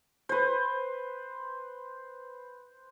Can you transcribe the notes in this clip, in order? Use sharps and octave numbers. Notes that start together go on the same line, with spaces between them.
B4 C5